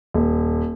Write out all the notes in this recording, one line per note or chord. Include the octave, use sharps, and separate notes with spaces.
D#1